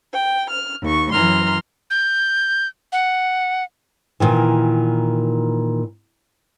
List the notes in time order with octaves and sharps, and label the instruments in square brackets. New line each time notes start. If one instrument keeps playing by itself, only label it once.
[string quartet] G5
F6
D#2 C#6
F#2 E3 A#5 C6 F6
[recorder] G6
F#5
[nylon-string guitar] A#2 D#3 E3